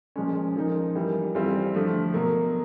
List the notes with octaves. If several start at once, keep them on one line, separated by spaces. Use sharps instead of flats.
A#2 F3 G#3 C#4
F3 A#3 D#4
E3 G3 A#3
E3 G3 C4 F4
D3 F3 A3
B2 F#3 A#3